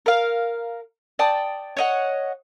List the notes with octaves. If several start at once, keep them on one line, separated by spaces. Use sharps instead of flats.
A#4 F5
D5 G5 A5 D#6
C#5 D#5 F#5